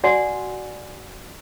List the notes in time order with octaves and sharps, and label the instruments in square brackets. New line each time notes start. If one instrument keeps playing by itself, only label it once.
[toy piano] F#4 D5 F#5 G#5 C6